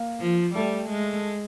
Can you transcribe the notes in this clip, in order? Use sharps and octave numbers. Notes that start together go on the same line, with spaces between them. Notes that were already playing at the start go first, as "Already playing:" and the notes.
Already playing: A#3
F3
G3 A3
G#3